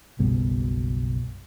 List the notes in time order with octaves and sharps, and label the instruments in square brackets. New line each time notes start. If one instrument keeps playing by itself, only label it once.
[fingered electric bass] F#1 B1 B2 G3